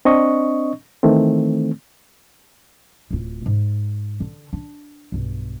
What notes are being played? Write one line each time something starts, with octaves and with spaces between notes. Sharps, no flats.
C4 D4 D#5 C#6
D#3 E3 A3 C4
D1 F4
G#2
D3
D4
B1 G2